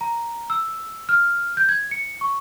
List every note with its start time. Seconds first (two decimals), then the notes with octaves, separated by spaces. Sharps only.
0.01 A#5
0.50 E6
1.09 F6
1.57 G6
1.69 G#6
1.91 C#7
2.21 C#6